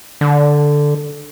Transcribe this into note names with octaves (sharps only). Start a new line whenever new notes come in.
D3